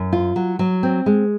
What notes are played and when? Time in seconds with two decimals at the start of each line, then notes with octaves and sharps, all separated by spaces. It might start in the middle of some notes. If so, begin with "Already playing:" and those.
Already playing: F#2
0.13 F4
0.36 F#3
0.59 F#3
0.83 C4
1.06 G#3